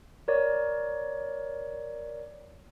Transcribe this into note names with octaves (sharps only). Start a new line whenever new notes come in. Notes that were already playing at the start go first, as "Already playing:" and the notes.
A#4 C#5 D5